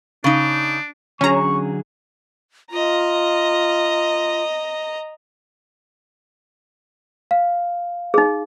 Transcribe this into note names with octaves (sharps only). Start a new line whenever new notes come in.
C#3 D4 D#4
D3 F#3 C#4 G#4 A#5 C#6
F4 D#5 A#5
F5
D#4 G#4